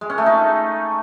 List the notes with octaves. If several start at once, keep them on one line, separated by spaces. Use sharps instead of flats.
G#3
C#4
A3
D#4